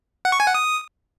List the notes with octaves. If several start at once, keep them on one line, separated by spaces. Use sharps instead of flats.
F#5
C#6
G#5
F#5
D#6